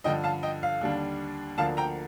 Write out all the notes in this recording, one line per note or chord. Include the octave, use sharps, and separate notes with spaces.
G2 D3 F3 D#5 G5
F5 A5
D#5 G5
F5
D#2 D3 G3 D4
D2 D3 F3 A#3 F5 A5
G5 A#5